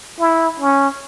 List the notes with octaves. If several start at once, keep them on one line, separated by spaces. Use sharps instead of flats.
E4
C#4